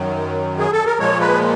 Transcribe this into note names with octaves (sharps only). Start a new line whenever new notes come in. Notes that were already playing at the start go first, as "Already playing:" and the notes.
Already playing: F#2 D#3 F#3
G#4
A4
A#4
A#2 F3 G#3 C#5
B4